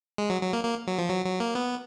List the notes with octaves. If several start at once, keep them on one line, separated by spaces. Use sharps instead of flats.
G#3
F#3
F#3
A#3
A#3
F#3
F3
F#3
F#3
A#3
B3